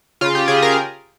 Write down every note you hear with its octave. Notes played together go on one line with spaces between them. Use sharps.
C#3 F4
G4
C#3 G#4
A#4